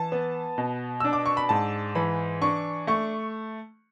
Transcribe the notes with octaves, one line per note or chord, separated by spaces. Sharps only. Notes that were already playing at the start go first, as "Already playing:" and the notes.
Already playing: E3 A5
B3
B2
D4 E6
D6
C#6
B5
G#2 A5
E3 B5
D4 C#6
A3 C#6